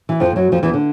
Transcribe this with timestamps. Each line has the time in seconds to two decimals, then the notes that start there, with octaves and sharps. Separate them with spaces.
0.09 E3
0.20 F2 F3
0.36 F#2 F#3
0.52 F2 F3
0.63 E2 E3
0.74 D3